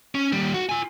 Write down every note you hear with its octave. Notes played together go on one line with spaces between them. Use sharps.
C#4
D#2 G3
F#4
F4 G#5